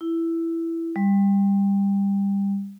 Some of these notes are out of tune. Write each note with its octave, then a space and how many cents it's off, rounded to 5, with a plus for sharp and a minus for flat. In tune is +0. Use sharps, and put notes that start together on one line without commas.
E4 +10
G3 +20